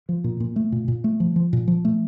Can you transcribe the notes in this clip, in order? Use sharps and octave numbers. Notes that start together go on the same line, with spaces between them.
F3
A#2
A#2
A3
A#2
A#2
A3
F3
F3
A#2
F3
A3